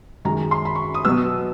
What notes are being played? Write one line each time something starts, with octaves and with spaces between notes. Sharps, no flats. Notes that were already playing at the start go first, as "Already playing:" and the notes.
F#2 D#3 G#3 A#5
C6
B5
C#6
D#6
B2 F#3 B3 E6